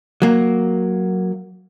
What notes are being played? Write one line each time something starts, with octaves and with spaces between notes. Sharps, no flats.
F#3 A#3